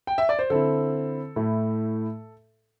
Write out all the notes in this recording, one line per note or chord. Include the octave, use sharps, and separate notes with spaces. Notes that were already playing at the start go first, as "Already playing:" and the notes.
G5
E5
D5
C5
D3 C4 E4 A4
A2 A3 E4